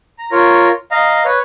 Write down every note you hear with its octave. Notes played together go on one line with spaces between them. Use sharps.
A#5
F4 A#4 C#5
D#5 F5 A#5
B4 C#5